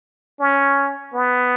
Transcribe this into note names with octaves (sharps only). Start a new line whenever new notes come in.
C#4
B3